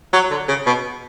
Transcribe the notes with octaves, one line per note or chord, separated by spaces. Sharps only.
F#3
D3
C#3
B2